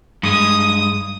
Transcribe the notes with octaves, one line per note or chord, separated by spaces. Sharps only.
G2 G#3 D#6